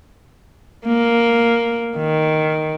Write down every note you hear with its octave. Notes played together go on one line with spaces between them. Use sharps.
A#3
D#3